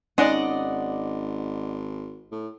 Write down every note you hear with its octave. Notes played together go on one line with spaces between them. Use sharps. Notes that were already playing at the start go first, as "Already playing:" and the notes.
G#1 G#3 C#4 D#4 D5 D#5 F#5
A2